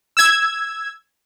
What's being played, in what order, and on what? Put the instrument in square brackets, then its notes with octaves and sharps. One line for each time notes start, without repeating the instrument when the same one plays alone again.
[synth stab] E6 G#6